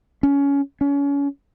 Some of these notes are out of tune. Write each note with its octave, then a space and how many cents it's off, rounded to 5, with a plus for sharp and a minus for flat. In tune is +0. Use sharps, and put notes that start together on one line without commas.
C#4 +20
C#4 +30